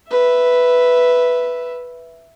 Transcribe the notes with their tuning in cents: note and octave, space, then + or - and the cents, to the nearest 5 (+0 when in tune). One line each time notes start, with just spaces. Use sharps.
B4 +0 E5 +0